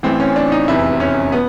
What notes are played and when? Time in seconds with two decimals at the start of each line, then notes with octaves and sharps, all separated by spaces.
0.03 A1 A2 E3 C4
0.20 C#4
0.36 D4
0.52 D#4
0.68 F1 E2 C3 E3 E4
1.00 C#4
1.32 B3